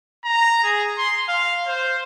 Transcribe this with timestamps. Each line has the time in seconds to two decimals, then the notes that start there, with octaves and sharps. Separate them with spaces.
0.24 A#5
0.64 G#4
0.98 C6
1.28 F5
1.67 C5